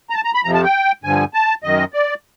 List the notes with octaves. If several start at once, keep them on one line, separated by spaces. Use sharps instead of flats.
A#5
A5
A#5
B5
F2 C3 F3 A#5
A5
G5
G2 D3 F3 G#5
A5
F#2 D#3 D#5
D5